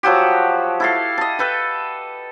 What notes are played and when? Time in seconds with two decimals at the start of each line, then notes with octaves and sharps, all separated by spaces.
0.03 F3 F#3 F#4 G4
0.80 E4 A4 F5
1.18 D#5 A5
1.39 A4 B4 G5